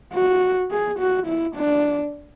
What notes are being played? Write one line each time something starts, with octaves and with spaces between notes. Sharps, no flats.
F#4
G#4
F#4
E4
D4